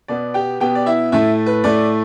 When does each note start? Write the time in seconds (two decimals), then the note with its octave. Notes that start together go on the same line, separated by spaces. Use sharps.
0.08 B2 B3 D5
0.34 G4 G5
0.60 B2 B3 G4 G5
0.75 D5
0.86 E4 E5
1.12 A2 A3 E4 E5
1.46 B4
1.64 A2 A3 D5